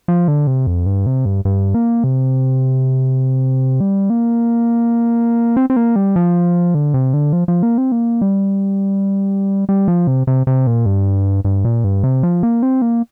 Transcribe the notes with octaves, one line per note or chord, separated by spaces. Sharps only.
F3
D3
C3
F2
G2
C3
G2
G2
A#3
C3
G3
A#3
C4
C4
A#3
G3
F3
D3
C3
D3
F3
F3
A#3
C4
A#3
G3
G3
F3
C3
C3
C3
A#2
G2
G2
A#2
G2
C3
F3
A#3
C4
A#3